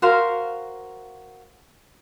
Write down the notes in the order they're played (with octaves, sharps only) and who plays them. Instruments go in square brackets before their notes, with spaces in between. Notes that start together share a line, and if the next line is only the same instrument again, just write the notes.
[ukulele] F#4 A#4 C5 F5